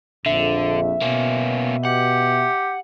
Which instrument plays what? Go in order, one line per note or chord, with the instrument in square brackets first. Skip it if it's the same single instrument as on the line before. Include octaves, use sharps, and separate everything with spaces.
[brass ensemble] A#1 F2 [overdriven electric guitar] D3 [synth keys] E5
[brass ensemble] B2 [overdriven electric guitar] A#3 C#4
[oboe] G4 [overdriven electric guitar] F#5